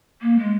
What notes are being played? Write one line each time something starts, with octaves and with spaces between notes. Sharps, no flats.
A#3
G#3